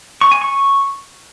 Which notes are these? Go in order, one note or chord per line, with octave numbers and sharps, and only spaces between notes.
C#6
G#5
C#6